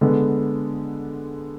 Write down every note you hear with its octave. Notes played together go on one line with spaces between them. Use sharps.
D3 G#3 B3